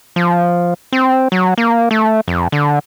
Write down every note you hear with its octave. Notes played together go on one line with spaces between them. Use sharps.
F3
C4
F#3
A#3
A3
F2
D3